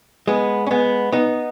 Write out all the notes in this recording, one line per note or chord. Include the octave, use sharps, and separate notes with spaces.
G#3 B3
C#4
G#3 B3
B3 D#4